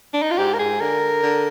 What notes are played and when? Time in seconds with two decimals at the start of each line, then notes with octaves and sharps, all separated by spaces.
0.14 D4
0.22 D#4
0.31 F4
0.38 G#2 G4
0.54 A#4
0.59 G#2 G#4
0.80 D3 A#4
1.23 D3